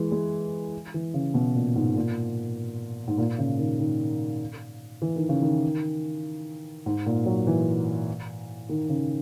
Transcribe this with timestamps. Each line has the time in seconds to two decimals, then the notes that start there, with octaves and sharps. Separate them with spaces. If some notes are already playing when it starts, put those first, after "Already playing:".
Already playing: E3 G#3
0.12 G#3
0.94 E3
1.14 C#3
1.34 B2
1.55 A#2
1.76 G#2
1.96 A#2
3.08 G#2
3.18 A#2
3.38 C#3
3.59 D#3
3.79 D#3
5.02 E3
5.16 D#3
5.29 C#3
5.42 D#3
6.86 G#2
7.06 A#2
7.26 F#3
7.47 E3
8.69 D#3
8.89 C#3